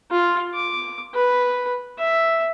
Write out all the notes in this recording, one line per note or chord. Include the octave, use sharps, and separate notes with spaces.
F4
D6
B4
E5